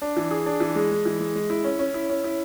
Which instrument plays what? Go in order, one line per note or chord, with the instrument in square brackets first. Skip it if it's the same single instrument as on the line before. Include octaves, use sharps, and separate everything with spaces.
[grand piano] D4
E3
G#4
D4
E3
G#3
G#3
E3
G#3
G#3
E4
C#4
C#4
E4
C#4
E4